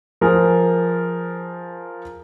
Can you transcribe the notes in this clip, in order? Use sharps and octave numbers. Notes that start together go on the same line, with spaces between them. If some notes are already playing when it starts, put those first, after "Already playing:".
F3 G#4 A#4